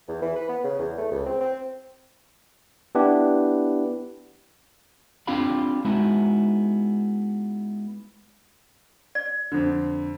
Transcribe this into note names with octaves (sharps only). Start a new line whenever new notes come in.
E2
E3
B4
B3
C#3
E2
A3
C#2
C4
C4
B3 D4 E4 G4 B4
C4 D4 F4 G4 F5 B5
G#3 B3 D#4 E4 F#4
D5
F2 D3